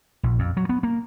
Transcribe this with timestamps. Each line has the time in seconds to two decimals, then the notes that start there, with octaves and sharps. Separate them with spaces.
0.23 A#1
0.39 F2
0.57 F#3
0.69 B3
0.83 A#3